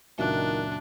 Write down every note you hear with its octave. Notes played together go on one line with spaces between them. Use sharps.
C#2 F#2 A#2 D#3 D4 E5 F#6